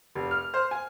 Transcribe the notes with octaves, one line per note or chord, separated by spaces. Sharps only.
F1
F6
C5
G#5